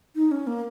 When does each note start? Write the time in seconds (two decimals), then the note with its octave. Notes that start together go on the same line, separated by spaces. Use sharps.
0.16 D#4
0.31 C#4
0.47 A#3